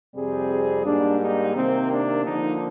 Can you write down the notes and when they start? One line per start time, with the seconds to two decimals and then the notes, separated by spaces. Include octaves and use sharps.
0.15 F2 C3 G3 C4 G#4
0.84 G#2 G3 A#3 D4
1.20 D#4
1.54 C3 D#3 A#3 C4
1.90 D4
2.24 D3 F3 A#3 D#4